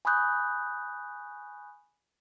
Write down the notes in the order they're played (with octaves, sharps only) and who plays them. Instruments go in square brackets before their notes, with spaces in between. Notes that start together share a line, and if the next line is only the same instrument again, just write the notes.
[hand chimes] G#5 B5 C#6 D#6 F#6 G6